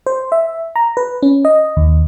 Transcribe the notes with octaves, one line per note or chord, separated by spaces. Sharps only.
C5
E5
A#5
B4
C#4
D#5
D#2